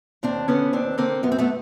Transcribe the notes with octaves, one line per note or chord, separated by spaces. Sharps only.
D#2 C4 D4
D3 B3 C#4
D#2 C4 D4
D3 A#3 C4
F#2 B3
C4
A3 B3